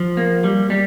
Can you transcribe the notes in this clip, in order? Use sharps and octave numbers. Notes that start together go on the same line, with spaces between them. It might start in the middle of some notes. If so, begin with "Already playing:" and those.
Already playing: F3
A#3
G3
G3